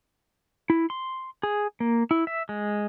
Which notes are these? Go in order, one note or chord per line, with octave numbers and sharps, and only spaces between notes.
E4
C6
G#4
A#3
E4
E5
G#3